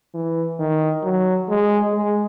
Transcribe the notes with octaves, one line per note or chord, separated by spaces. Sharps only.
E3
D#3
F#3
G#3
G#3